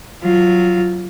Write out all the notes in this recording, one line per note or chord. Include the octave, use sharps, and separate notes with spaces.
F#3 F4